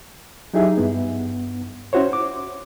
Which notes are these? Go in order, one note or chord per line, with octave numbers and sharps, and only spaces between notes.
F#3 D#4 E4 G4 G#4 E5
G2 B3
C#4 E4 F#4 C5 C#5
D6